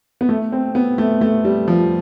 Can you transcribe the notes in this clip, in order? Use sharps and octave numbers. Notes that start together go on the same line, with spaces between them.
B3
A3
C4
B3
A3
A3
G3
F3